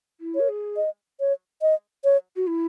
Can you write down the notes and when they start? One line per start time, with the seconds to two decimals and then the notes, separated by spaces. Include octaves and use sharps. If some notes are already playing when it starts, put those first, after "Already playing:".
0.20 E4
0.35 A#4 C#5
0.48 G#4
0.77 D#5
1.20 C#5
1.62 D#5
2.04 C#5
2.36 F#4
2.47 E4